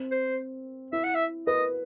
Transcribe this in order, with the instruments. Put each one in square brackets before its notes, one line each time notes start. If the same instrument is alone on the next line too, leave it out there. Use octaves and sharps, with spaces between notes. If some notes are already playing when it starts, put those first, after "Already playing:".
Already playing: [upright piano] C4
[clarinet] C5
[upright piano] E4 [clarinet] E5
[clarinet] F#5
E5
[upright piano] B4 [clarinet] D#5